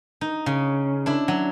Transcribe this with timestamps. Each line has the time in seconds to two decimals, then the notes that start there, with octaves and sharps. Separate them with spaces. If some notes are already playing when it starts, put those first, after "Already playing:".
0.21 D#4
0.46 C#3
1.06 D4 E4
1.28 F#3